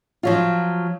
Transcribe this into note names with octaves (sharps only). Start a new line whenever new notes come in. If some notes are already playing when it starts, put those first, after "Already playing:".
F3 F#3 F4